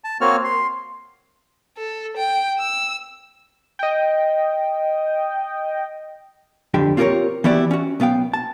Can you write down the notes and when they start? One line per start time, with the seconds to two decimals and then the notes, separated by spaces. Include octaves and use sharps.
0.04 A5
0.21 A#3 C4 F#4 C#5 F6
0.44 C6
1.77 A4
2.17 G5
2.59 E6
3.79 D#5 G5
6.74 F2 D3 G4 G5
6.97 C4 F4 G4 G#4 A#4 C#5
7.44 E3 B3 E4 F#4 G4 D5
7.71 C#4 F#4
8.00 B1 B3 F5 G5
8.34 A5